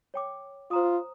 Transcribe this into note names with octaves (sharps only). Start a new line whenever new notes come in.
C#5 G5 D6
F4 C5 A#5 D#6